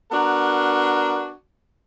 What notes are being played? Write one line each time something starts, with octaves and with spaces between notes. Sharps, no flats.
B3 D4 F#4 A#4